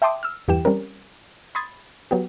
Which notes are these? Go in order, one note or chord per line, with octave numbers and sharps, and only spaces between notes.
E5 G5 A5 C6 D6 D#6
E6 F6
E2 G2 E3 G4 G5 E7
G3 C4 C#4 A#4
B5 C6 D#6 G#6 A6
F#3 B3 G4